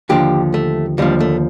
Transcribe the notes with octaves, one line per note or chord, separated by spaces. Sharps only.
D#2 D3 F3 G4
A3
D#2 D3 F3 G3
A3